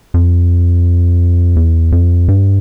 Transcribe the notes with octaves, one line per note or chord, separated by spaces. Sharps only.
F2
E2
F2
G2